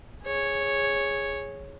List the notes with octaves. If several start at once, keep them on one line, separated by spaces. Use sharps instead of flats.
G#4 C#5